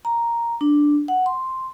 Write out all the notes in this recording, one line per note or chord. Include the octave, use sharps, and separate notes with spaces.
A#5
D4
F#5
C6